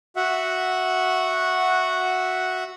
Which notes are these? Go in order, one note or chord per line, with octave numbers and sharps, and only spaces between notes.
F#4 E5 F#5